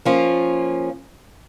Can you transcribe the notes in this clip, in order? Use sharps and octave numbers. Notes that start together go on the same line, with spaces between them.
F3 A#3 C#4 F4